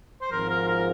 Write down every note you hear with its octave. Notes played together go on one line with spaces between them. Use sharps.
C5
G#1 G#2 F3 A#4
A#4
A#4